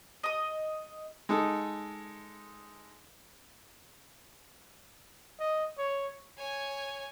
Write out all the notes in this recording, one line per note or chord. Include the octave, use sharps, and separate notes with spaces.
D#5 D#6
G#3 D#4 A4
D#5
C#5
C#5 G#5